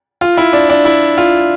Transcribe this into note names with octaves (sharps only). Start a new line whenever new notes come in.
F4
E4
D4
D4
E4
F4